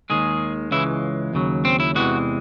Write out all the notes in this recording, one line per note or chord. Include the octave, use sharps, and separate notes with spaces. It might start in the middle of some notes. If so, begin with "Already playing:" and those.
D#2 D#3 G#3 G#4
C#2 C#3 E3 G#3 E4
D#2 C#3 F#3
C4
E4
E2 C3 E3 G#3 F#4